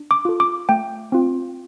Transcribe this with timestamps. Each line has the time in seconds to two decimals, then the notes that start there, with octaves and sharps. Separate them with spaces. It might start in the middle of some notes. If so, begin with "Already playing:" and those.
Already playing: D4
0.11 D6
0.25 F4 A4
0.40 D6
0.69 A3 G5
1.12 C4 F4